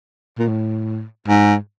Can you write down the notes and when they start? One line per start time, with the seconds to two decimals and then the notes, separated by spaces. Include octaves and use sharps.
0.39 A#2
0.48 A2
1.28 G#2